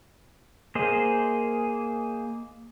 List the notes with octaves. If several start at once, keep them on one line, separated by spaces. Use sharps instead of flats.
A#3 G#4 C5 D#5